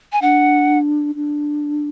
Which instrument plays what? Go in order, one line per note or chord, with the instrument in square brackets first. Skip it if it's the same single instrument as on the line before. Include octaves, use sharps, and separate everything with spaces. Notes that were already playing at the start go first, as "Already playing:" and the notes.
[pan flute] G#5
[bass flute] D4 [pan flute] F#5
[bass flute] D4